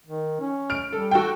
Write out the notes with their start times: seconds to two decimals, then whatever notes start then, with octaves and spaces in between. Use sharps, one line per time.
0.06 D#3
0.40 C#4
0.70 F6 D7
0.92 G3 A4
1.11 F#4 A4 G5